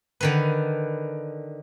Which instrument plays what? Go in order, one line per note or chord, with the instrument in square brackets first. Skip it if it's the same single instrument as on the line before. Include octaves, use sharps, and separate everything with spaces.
[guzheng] D3 D#3 B4